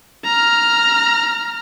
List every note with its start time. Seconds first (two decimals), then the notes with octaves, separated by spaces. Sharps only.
0.25 A#5 F6